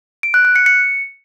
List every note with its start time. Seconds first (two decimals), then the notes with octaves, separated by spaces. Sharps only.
0.23 D7
0.34 F#6
0.45 F#6
0.56 C#7
0.66 C#7